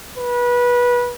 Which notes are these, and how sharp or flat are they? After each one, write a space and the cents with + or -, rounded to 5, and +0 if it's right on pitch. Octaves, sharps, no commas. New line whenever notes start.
B4 -25